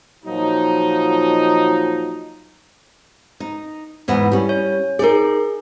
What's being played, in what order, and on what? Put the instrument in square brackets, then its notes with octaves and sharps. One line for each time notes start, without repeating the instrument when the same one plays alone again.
[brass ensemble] A#2 F3 F#3 D#4
[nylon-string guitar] D#4
E2 G#2 B3
G3 C#4
[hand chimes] C#5
[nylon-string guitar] D#4 D5 [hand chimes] G#4 A#4